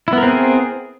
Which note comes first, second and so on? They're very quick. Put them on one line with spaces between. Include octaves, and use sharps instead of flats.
E4 B3 A#4 C4 G#4